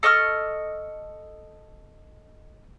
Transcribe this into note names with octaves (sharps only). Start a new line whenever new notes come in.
A4 D#5 C#6 F6